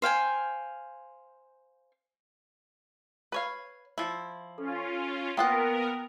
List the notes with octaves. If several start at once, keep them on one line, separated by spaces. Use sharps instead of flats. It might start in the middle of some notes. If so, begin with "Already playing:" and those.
C5 F5 G5 G#5
B4 C#5 F5
F3 E4
C#4 F4 A4
A#3 B3 F4 A#4 F#5 G5 D#6 F#6